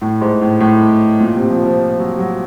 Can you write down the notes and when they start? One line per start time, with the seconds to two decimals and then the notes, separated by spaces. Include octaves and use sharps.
0.02 A2
0.21 G#2
0.41 A2
0.60 A2
1.20 A#2
1.35 C3
1.50 F3
1.65 F3
1.99 F#3
2.19 F#3